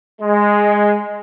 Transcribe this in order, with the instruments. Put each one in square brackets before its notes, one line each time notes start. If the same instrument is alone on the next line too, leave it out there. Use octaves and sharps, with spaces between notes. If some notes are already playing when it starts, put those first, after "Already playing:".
[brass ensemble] G#3